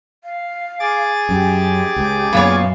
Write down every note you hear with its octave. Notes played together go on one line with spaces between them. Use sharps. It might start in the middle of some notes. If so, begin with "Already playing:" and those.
F5
G#4 D6 A6
F#2 G4
C#2
F#2 A#2 B3 C#5 F5